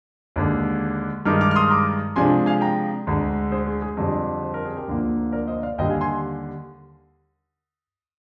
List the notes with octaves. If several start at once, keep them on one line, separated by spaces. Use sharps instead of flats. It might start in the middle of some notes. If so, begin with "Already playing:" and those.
D#2 D3 G#3
G2 D#3 G#3 D#4 D6 F6
D6 F6
F6
C6 D#6
A#5 D6
C3 F3 G#3 D4 G#5 C6
F5 G#5
G5 A#5
D2 D3 G#3
G#4 C5
G#4
G#4
F2 D3 G3 D4 G#4
C5
A#4
G#4
G4 A#4
D2 D3 F3 A#3
A#4 D5
C5 D#5
D5 F5
D#2 D3 G3 D#5 G5
F5 G#5
G#5 C6